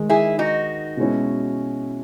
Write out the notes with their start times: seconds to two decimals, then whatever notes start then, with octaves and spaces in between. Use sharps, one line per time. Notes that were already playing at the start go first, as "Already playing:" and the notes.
Already playing: D#3 G#3 D#4
0.09 E4 G#4
0.39 D#4 F#4
0.97 B2 G#3 C#4 E4